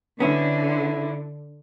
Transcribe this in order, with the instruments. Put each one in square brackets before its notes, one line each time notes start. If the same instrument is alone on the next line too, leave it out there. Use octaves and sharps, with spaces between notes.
[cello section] D3 [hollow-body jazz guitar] B3 C#4 E4